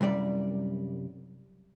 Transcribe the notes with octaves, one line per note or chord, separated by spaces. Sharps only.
C2 F#2 G3 D5